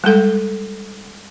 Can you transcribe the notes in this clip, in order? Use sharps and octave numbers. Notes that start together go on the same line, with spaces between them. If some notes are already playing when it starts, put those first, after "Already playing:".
G3 G#3 A4 F5